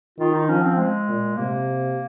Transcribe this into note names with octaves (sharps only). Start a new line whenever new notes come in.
D#3 F4
D#4
F3 C#4
C4
G#3
A#2
C3 A#3